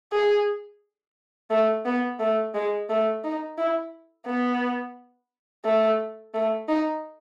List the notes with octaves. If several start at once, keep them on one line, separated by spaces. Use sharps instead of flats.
G#4
A3
B3
A3
G#3
A3
D#4
E4
B3
A3
A3
D#4